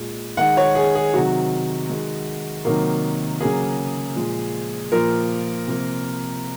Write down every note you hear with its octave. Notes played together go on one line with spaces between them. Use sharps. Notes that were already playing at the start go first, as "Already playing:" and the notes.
Already playing: A#2 G#3
D#3 G#3 F#5
C#5
G#4
G#4
C3 D#3 F#3 F#4
D#3 G#3
C3 D#3 F#3 A#3
C#3 F#3 A#3 G#4
A#2 F3 G#3
A#2 F3 A#3 A#4
C3 F3 A#3